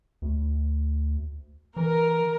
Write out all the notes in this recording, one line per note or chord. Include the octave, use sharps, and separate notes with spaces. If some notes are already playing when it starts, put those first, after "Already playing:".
D2
E3 A#4